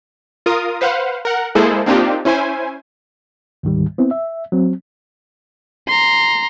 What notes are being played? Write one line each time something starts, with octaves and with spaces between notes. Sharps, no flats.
F4 A#4 D#6
B4 C5 F5 F#5
A#4 F#5
G#3 A#3 E4 G#4 A4 C5
A#3 C4 D4 D#4 F4 G4
C#4 E4 C5 G#5
D2 G#2 D#3 G3
B3 C4 E4
E5
F#3 C4
A#5 C6